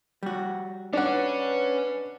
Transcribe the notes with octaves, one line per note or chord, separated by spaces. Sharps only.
G3 F#4
C#4 D4 B4 C#5 F#5